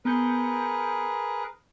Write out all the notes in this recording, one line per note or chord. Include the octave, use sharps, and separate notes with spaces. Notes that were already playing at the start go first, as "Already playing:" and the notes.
B3 G#4 A#4 B4 G6 C#7